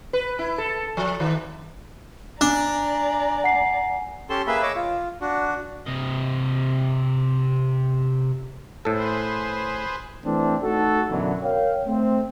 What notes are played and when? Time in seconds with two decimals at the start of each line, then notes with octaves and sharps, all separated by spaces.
0.13 B4
0.39 E4
0.58 A4
0.97 F3
1.20 D#3
2.41 D4 D5 G#5 A#5
3.44 F#5 C7
4.30 C#4 G4 A4 A5 C6
4.47 A#3 G#4 B4 E5 B5 E6
4.63 C#5 D#5 D6 E6
4.76 F4
5.21 D4 F#4
5.87 C3 D#5
8.85 A2 G#4 A4 B4 C5
10.24 E3 A3 C4 D4
10.63 A3 D#4 F#4 A4
11.11 F#2 B2 D3 E3 F#3
11.43 A#4 C#5 F5 G5
11.86 A3 C4